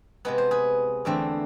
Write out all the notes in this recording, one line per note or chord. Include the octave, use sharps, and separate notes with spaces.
C3 G#3 B3 B4
C5
G#4 B4
E2 D3 A3 C4